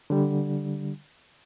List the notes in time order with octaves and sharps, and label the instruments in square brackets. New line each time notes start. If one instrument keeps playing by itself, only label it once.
[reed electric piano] D3 G3